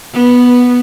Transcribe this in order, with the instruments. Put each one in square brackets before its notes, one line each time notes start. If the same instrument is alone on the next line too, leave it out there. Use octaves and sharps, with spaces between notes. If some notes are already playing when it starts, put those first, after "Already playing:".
[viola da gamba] B3